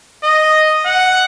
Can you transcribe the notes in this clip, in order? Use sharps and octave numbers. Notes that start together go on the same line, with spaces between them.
D#5
F#5